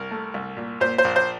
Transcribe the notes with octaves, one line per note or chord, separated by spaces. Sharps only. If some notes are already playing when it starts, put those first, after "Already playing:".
Already playing: C2 A#4
A3
C2
A#2
A#2 C5
C5
A#1
C5